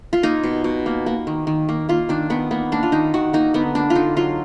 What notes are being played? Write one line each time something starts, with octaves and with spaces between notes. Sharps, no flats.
F4
A#3 D#4
B2
B2
A#3
A#3
D#3
D#3
A#3
A#3 F4
D#3 D4
D#3 B3
A#3 B3
A#3 D4
F4
D#3 D#4
D#3 F#4
A#3 D#4
D3 B3
A#3 D4
F4
D3 D#4
F#3 F4